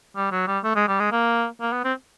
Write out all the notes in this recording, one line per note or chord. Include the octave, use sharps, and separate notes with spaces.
G3
F#3
G3
A3
G#3
G3
G#3
A#3
A#3
B3
C4